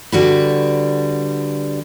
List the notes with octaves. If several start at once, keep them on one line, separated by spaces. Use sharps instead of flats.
D3 G3 F#4 B4